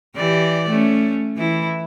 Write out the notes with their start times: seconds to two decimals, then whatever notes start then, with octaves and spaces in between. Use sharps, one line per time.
0.16 E3 G4 D5
0.70 A3 C#4
1.37 E3 E4